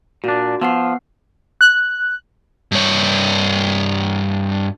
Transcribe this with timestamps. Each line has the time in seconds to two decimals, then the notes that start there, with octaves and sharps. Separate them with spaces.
0.24 A#2 D4 F#4
0.62 F3 B3 F#5 C7
1.61 F#6
2.72 G2 C#5